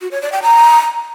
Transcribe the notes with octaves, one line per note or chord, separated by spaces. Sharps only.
F#4
C#5
D5
G5
A#5